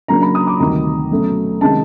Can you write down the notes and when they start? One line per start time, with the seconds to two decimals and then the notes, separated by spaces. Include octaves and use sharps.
0.08 C#3 F#3 A#3 D4 A#5
0.22 B5
0.35 D#6
0.47 D6
0.60 D2 C3 D#3 G3 A#5
1.11 B2 F#3 A3 C#4
1.61 C3 D#3 G#3 C#4 A5